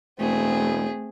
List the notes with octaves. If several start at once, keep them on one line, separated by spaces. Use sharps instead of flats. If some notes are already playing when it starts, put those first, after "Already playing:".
E1 A3 C4 G#4